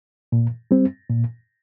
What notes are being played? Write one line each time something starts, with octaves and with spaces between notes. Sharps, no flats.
A#2
G3 C4
A#2